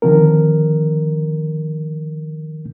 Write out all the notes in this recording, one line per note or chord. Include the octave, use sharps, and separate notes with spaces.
D3 D#3 F3 C4 A#4